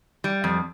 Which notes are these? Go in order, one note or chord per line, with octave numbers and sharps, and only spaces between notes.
G3
F2